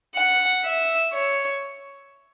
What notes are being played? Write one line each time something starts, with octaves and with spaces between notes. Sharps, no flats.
F#5
E5
C#5